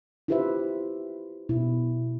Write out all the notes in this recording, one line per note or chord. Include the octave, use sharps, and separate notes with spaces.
E4 F4 G4 B4 C5 E5
B2 E4